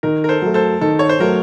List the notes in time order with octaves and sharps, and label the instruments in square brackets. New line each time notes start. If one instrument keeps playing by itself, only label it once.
[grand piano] D#3 [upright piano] A#4
[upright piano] A#4
A4 C5
[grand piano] F#3 A3
[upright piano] A4 C5
[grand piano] D#3 [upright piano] A4
[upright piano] C#5
C5
[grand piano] F#3 A3 [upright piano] A#4